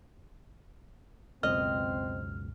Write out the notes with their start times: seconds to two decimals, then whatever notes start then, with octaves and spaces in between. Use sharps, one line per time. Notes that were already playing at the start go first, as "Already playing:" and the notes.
1.43 C#2 F#2 B2 C4 D#5 F6